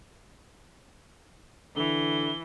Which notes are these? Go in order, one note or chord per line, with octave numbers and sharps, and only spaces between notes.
D3 E3 G7